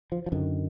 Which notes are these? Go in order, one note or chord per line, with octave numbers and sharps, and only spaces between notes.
F3
F3
F#2 D3 D#3